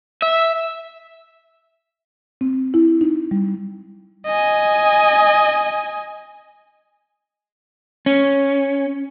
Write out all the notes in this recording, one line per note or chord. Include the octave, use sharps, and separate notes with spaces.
E5
C4
E4
D#4
G3
D#5 G#5
C#4